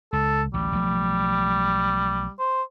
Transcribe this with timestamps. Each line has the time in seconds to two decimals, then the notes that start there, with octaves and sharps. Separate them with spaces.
0.13 C#2 A4
0.54 A1 D2 G3
0.72 B1 F3 A3
2.39 C5